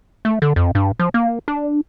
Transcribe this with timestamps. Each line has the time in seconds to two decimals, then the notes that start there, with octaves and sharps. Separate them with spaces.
0.25 A3
0.42 D3
0.56 F2
0.75 G2
0.99 F3
1.14 A#3
1.48 D4